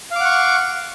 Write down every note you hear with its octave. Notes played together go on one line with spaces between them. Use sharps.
F5 F#5 C#6 D6